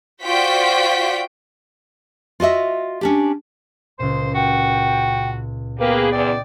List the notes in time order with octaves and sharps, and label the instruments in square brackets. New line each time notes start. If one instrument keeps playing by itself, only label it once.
[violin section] F4 F#4 C5 D5 G5 B6
[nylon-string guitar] F4 F#4 D#5 E5
C#4 D4 G4
[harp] C#2 A#2 [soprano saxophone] C5 [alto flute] C6
[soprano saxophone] F#4 [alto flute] G5
[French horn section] A#3 G#4 B4 [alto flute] B3 [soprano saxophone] G4
[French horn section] E2 [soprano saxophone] D5 [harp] D#5 G5 C7